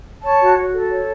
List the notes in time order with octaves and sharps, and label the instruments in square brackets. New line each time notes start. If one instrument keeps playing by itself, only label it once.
[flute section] C#5 [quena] A5
[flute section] F#4
F#4
A4
C#5